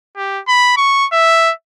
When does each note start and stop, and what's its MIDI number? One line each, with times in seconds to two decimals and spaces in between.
0.17 0.41 67
0.48 0.74 83
0.77 1.06 85
1.12 1.52 76